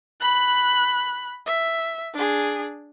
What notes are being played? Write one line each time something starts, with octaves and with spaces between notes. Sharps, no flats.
B5 F#6
E5
D4 G#4